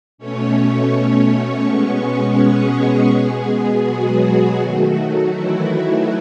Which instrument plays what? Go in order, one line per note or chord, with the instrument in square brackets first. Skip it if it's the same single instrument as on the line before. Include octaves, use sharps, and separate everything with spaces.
[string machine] B2 A3 C#4 C#5
C#4 C#5
B2 G#3 B3 C#4 C#5
G#3 G#4
B2 G#3 B3
F#3 F#4
D#3 F#3 A3
E3 E4